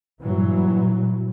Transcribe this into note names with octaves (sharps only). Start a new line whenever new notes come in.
G2 A#2 E3 F#3